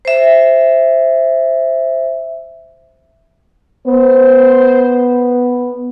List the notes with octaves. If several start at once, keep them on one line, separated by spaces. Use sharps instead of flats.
C5 E5
B3 C5